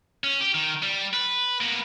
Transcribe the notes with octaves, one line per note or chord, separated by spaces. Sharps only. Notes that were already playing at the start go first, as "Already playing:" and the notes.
C#4
G4
D#3
G3
B4
A#3 B3